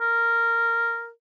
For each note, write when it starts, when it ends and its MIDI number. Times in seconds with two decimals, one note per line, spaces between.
0.01 1.10 70